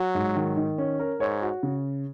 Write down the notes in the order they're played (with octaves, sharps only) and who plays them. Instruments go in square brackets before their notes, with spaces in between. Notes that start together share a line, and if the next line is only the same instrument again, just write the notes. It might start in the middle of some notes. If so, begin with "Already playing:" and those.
Already playing: [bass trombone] F#3 [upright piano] F#4
[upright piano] G#2
D#3
D#3
C#4
A#4
[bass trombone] G#2 [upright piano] C#5
[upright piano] F#4
C#3